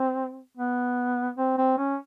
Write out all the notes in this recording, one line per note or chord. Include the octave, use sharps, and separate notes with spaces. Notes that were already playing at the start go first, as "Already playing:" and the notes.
Already playing: C4
B3
C4
C4
C#4